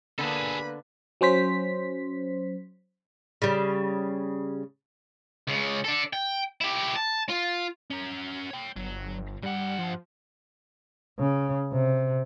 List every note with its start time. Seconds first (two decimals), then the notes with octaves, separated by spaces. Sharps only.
0.19 D3 A#3 B3 G#4 A4 B4 B5
1.21 F#3 C#4 C5 B6
3.42 C#3 G3
5.47 C#2 C#3
5.84 D4 A4
6.13 G5
6.61 E4 G4
6.96 A5
7.29 F4
7.90 C#4 A#4
8.50 C#5 G5
8.76 G1 F#3
9.43 G2 G3 F#5
9.79 F3
11.19 C#3
11.72 C3